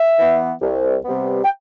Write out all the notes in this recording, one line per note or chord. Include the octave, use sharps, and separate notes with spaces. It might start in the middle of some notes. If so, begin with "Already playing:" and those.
Already playing: E5
E3 B3
C2
C3 G3 B3
G5